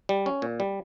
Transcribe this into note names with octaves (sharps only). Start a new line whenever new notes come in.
G3
C#4
A#2
G3